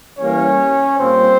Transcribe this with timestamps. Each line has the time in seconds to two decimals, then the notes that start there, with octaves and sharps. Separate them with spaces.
0.18 E3 G3 A#3 C#4 C#5
0.98 A#2 G3 A#3 C4 C5